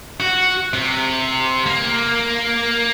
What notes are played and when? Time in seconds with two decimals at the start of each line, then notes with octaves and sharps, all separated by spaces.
0.20 F#4
0.73 C3
1.66 A#3